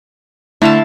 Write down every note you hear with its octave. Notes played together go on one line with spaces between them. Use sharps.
D3 A3 E4 F5 A5